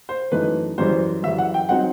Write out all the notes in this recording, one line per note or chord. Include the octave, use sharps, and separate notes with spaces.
C5
F#2 E3 A3 D#4 B4
F#2 E3 G3 C5
F#2 E3 G3 E5
F#5
G5
F#3 C4 D#4 F#5